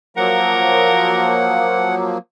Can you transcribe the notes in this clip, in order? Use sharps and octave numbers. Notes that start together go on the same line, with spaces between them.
F3 F#3 A#3 A#4 F#5